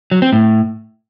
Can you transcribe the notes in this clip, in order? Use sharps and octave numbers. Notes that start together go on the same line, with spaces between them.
F#3
C4
A2